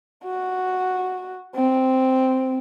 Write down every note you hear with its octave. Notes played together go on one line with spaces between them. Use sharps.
F#4
C4